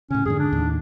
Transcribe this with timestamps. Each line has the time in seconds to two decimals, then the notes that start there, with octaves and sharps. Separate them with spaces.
0.10 A2 C#3 C#4
0.25 F2 G#2 D3 G#4
0.39 D4
0.52 D#2 A2